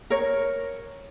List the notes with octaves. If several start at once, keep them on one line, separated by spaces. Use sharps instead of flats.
A#4 C#5